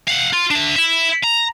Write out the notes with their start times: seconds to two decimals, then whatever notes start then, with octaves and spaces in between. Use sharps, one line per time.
0.07 F5 F#5
0.33 F4
0.51 D4 E5
0.76 E4 E5
1.24 A#5